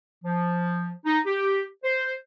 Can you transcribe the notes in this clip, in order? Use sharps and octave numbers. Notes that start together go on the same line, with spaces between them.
F3
D#4
G4
C5